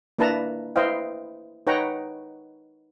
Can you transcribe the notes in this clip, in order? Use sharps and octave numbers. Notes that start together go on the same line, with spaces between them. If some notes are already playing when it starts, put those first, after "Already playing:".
A#3 D4 E4 B4 A5 A#5
E4 B4 C5 D#5 F5 G5
D#4 B4 C#5 F#5 G5 A#5